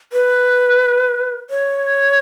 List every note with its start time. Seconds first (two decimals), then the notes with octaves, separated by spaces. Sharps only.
0.13 B4
1.50 C#5